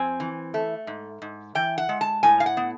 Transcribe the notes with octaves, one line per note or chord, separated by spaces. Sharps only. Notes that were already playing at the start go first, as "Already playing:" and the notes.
Already playing: F2 C4 G#5
E3
A3
G#2
G#2
E3 G5
F#5
G#3
A5
A2 G#5
F5
F#5
B3